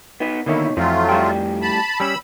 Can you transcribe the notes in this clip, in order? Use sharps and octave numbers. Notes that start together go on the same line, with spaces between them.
B3 D#4 B4
B2 D3 D#3 A#3 D#4 E4 C#5
F2 E3 F#3 A3 C4 F4
A2 G3 G5
A5 B5
G3 C#4 B5 E6